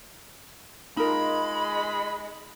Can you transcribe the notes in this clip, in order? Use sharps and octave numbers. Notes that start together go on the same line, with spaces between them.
G#3 D#4 F4 A#4 B5